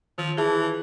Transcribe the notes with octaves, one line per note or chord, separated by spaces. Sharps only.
D#3 F3
E3 G#4 E5 A5